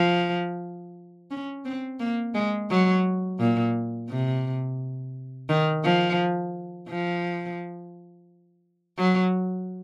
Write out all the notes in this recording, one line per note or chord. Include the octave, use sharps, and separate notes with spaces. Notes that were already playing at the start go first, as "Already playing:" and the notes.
Already playing: F3
C#4
C4
A#3
G#3
F#3
A#2
C3
D#3
F3
F3
F#3